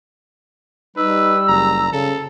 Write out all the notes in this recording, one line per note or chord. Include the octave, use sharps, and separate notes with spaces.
G3 D#4 B4 E6
F#1 A#5
C#3 A4